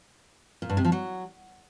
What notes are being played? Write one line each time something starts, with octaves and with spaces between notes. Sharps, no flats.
A#2
G2
C3
F3
F#3